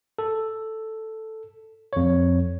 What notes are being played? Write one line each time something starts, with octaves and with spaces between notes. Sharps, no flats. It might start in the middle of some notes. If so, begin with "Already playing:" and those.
A4
F2 C#5